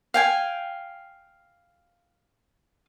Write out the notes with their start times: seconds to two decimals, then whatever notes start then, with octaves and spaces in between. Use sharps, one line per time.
0.14 F5 G5 G#5